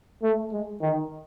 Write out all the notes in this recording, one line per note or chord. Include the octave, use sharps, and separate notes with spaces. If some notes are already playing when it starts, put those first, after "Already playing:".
A3
G#3
D#3